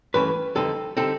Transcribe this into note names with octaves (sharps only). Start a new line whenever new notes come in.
G2 E3 A3 C#4 B4
F2 D3 G3 C4 D#4 A4
D3 G3 C4 D#4 A4